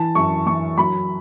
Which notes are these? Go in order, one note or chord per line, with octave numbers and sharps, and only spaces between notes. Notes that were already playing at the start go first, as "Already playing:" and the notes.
Already playing: E3 A5
F#2 C#6
E3 C#6
F#3 B5